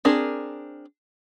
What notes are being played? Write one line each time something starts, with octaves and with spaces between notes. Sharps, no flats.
C4 D4 G#4 A#4